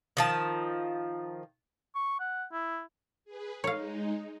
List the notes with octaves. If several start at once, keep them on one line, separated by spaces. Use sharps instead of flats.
D#3 F3 A5
C#6
F#5
E4
G#4 B4
G#3 D#4 C#5 F5